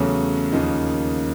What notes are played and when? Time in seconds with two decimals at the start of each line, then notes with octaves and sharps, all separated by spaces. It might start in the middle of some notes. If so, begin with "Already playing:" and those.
Already playing: E2 C#3 F#3 A3
0.52 D#2 C#3 F3 A#3 D#4